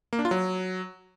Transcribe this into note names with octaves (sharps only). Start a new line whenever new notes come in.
A#3
D4
F4
F#3